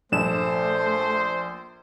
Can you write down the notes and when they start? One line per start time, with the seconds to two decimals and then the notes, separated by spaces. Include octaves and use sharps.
0.12 A#1 G2 A3 D4 C5 E7